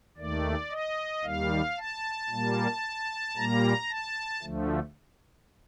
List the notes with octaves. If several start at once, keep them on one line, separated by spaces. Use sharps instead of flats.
D#2 D#3 A3 D5
D#5
D#2 D#3 G3 F5
A5
A#2 G3 A#3
A#2 G3 A#3 A#5
A5
D2 D3 F3 A3